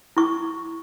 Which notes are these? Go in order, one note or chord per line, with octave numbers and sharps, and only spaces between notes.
E4 C#6